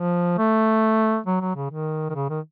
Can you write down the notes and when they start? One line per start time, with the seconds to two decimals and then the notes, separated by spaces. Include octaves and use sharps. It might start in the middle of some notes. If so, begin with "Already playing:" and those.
Already playing: F3
0.38 A3
1.26 F#3
1.41 F#3
1.55 C#3
1.71 D#3
2.10 D#3
2.15 C#3
2.30 D#3